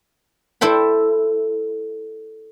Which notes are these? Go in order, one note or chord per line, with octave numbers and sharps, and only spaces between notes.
E4 A4 C5 G5 B5